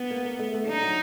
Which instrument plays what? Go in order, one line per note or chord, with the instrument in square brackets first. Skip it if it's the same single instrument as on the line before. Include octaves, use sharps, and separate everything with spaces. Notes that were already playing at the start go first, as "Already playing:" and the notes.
Already playing: [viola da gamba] B3
[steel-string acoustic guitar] A#3
A#3
A3
A3
[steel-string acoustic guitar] G3 [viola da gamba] D#4
[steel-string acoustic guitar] F#3